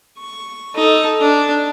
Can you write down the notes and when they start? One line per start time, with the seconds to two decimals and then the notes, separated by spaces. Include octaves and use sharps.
0.19 C#6
0.75 D#4 A4
1.21 D4